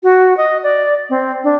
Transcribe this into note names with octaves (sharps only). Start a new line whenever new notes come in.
F#4
D#5
D5
C4
D4